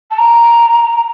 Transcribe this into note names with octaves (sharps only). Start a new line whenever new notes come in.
A5
A#5